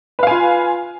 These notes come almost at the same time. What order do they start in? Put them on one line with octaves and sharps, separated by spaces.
B4 F5 G#5 F4